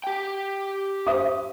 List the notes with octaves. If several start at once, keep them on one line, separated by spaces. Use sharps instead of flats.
G4 G5
C5 E5 D#6